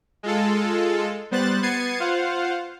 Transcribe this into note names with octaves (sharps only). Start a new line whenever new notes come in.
G#3 F4 A4
G3 B3 C5 F#6 A6
B3 G#6 A6 C7 C#7 D#7
F4 C5 F5 F#5